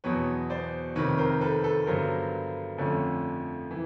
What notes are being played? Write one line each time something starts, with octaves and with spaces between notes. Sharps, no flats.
E2 B2 F#3 B4 C#5
C5 D5
F2 C3 D#3 B4 C#5
A#4 C5
A4 B4
A4 B4
G2 D3 F#3 B3 A#4 C5
F2 D3 F3 A3 C#4
E3